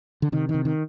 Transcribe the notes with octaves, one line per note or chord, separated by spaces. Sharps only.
D3
C3 D#3
D#3
C3
D#3